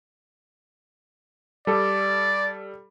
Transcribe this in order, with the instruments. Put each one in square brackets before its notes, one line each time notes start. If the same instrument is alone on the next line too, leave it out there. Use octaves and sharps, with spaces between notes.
[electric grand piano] G3 A4 [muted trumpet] D5